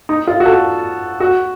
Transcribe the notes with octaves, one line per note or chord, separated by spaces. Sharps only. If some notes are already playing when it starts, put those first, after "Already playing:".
D#4
F4
F#4
A4
F#4